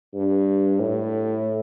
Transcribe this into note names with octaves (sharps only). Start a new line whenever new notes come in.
G2
A2